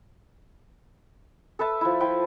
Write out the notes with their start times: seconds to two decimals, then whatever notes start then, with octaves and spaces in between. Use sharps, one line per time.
1.59 A4 B4 E5 A5
1.81 F3 E4
2.00 F3 E4 G5